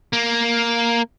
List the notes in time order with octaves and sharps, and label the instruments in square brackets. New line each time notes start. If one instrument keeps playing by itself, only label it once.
[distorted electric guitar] A#3